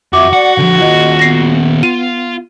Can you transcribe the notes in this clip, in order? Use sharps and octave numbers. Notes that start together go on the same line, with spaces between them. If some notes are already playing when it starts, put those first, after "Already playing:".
F2 F#4 E5 D6
D5 F#5
D3 F3 F#5
D#2 F4 D#5
B3 A#6 C7
F4 D#7